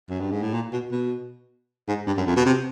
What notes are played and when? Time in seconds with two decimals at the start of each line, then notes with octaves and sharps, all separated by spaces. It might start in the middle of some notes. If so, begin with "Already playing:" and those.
0.09 F#2
0.20 G2
0.31 G#2
0.42 A2
0.54 A#2
0.72 B2
0.91 B2
1.88 G#2
2.07 G2
2.17 F#2
2.26 F2
2.36 B2
2.46 C3